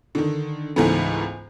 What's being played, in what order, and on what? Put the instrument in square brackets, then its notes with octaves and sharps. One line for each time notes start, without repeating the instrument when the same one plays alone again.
[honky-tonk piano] D3 D#3
C#2 G#2 E3 A3 B3